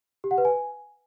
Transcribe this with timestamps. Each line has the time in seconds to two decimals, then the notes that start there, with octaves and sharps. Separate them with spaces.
0.24 G4
0.31 F#5
0.38 B4
0.45 G#5